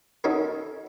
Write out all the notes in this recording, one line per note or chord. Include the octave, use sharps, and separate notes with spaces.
C#4 D#4 F#4 A4 A#4